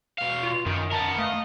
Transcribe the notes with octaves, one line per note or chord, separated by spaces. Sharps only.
B2 F5 F7
F4
F#2 D#3
B3 A#4 A5
A3 D#5 F5